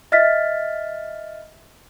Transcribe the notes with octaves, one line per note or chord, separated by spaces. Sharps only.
D#5 E5 F6 A6 B6